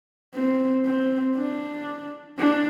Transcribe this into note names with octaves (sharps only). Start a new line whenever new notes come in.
C4
C4
D4
D4